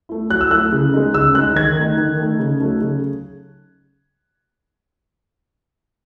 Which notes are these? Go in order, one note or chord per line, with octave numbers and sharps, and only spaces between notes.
A3 E4
F#3 F#6
E6
A3 E4 F#6
C#3
G#3 D#4
C#3 E6
G#3 D#4 F#6
D#3 G#6
A3
D#4
D#3
A3 D#4
C#3
F#3 A3 D#4
C#3